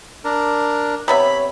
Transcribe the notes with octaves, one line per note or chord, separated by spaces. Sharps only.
D4 A#4
C3 B3 C#5 E5 B5